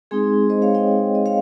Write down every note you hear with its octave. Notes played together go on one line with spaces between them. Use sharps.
G#3 C4 D#4 G#4
C5 D#5
C#5 F5
D#5 G5
D#5
C#5 F5